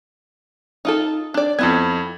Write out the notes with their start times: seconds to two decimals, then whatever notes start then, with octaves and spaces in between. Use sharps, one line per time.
0.85 D#4 F4 A4
1.34 D4 D5
1.59 F2 B3 E4 A4 G#6